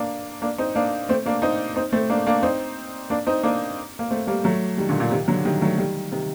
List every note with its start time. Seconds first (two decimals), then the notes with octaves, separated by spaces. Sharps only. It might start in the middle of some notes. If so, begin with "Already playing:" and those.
Already playing: A#3 D4
0.42 A#3 D4
0.58 C4 D#4
0.75 A#3 D4
1.09 A3 C4
1.26 A#3 D4
1.42 C4 D#4
1.76 C4 D#4
1.92 A3 C4
2.10 A#3 D4
2.26 A#3 D4
2.43 C4 D#4
3.10 A#3 D4
3.27 C4 D#4
3.43 A#3 D4
3.99 A#3
4.11 A3 C4
4.27 G3 A#3
4.44 F#3 A3
4.78 D#3 G3
4.89 A#2 D3
5.00 A#2 D3
5.11 C3 D#3
5.28 D3 F#3
5.45 D#3 G3
5.61 F#3 A3
5.78 D#3 G3
6.12 C3 D#3